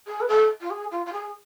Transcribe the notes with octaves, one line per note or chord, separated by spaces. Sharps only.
G#4
B4
A4
F4
G#4
F4
F4
G#4